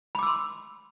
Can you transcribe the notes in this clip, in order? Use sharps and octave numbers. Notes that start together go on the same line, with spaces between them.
B5 C6 D6 E6